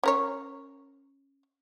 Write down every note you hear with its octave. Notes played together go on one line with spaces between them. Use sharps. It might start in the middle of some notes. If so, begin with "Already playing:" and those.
C#4 A#4 C#5